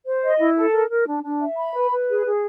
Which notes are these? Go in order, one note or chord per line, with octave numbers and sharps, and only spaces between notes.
C5
D#5
E4
A4
A#4
A#4
D4
D4
E5
B5
B4
B4
G#4
G#4